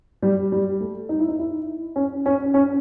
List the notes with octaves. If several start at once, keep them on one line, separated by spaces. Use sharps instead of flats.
G3
G3
A3
D#4
E4
D#4
E4
C#4
C#4
C#4